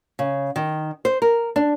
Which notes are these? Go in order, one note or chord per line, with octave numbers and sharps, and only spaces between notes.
C#3
D#3
C5
A#4
D4